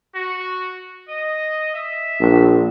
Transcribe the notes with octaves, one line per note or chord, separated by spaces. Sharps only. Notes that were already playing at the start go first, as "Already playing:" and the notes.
F#4
D#5
E5
A#1